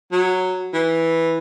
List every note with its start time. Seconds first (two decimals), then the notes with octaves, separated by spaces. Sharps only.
0.12 F#3
0.74 E3